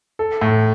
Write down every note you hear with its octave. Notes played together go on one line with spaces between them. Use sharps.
A4
A2